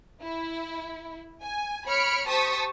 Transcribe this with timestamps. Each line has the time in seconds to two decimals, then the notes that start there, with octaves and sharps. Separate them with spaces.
0.21 E4
1.43 G#5
1.87 C#5 B5 F6 C#7 D7
2.27 G4 C5 A5 C#6 D#6 B6